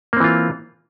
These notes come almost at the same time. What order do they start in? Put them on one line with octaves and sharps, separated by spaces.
A#3 C4 E3 F4